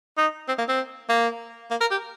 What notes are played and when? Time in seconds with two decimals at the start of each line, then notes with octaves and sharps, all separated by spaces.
0.18 D#4
0.48 C4
0.58 A#3
0.69 C4
1.09 A#3
1.71 A#3
1.81 A#4
1.91 G4